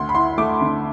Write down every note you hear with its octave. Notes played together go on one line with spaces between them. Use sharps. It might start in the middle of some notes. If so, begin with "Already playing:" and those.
Already playing: D2 C6
B5
E4 C6
A3 D6
D3